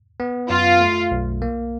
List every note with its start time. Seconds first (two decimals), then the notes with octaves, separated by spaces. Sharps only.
0.20 B3
0.50 F#2 F4
0.80 A3
1.11 B1
1.42 A#3